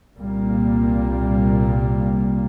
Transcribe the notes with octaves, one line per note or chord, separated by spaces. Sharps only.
C2 A#2 G3 A#3